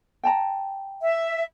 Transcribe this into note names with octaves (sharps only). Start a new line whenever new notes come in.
G5 A5 A#5
E5